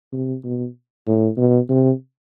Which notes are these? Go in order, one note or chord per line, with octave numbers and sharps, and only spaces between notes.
C3
B2
A2
B2
C3